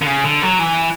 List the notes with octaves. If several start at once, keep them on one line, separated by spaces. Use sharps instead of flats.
D3
C#3
D3
F#3
E3